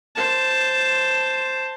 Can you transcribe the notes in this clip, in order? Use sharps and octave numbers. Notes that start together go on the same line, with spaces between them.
C5 A5